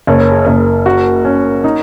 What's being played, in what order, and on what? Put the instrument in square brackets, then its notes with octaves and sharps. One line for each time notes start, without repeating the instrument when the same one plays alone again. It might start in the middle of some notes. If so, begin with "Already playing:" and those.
[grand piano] F#1 [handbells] C#5
[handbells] A#4
G#4
[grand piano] F#1 [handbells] A#4
[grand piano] F#4
C#4
D#4